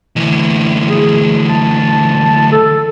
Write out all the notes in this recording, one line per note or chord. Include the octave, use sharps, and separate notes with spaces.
D2 E3
G#4
A5
A4